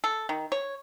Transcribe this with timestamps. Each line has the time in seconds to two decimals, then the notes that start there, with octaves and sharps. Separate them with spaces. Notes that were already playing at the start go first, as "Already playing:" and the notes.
0.04 A4
0.29 D#3
0.52 C#5